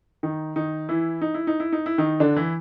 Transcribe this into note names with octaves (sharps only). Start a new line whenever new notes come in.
D#3 D#4
D#3 D#4
E3 E4
D#4
E4
D#4
E4
D#4
E4
D#3 D#4
D3 D4
E3 E4